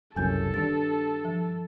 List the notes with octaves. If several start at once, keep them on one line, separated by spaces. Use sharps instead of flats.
F#1 C2 F#2 A4 G#5 G6
G2 D#3 D4 A6
F3